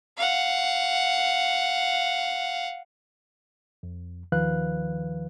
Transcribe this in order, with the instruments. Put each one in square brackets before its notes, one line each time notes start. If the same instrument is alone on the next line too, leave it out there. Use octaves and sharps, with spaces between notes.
[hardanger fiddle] F5 F#5
[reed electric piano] F2
D#2 D#3 F3 B4 F5 F#6